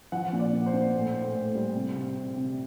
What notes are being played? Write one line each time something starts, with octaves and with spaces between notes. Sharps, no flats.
F3 F#5
A#2
D5
A#2
C5
A#2
A2
A2
A2
G3
C3
C3
C3
C3